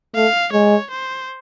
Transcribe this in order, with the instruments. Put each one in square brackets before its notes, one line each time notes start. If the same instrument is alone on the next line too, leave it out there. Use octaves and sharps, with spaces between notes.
[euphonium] A3 [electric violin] F5
[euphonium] G#3 [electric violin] C#5
[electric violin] C5